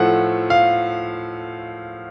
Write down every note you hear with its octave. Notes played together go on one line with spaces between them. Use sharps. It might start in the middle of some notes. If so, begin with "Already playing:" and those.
Already playing: A2 F3 A3 F#5
F5